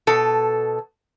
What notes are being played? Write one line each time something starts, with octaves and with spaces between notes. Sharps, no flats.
B2 A4